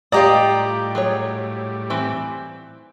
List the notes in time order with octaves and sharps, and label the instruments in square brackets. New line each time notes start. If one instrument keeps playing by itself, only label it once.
[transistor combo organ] A2 G3 [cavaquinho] F4 G4 D#6 [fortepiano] D5 D#5 A#5
[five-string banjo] F#3 G#4 C#5
E3 C4 E4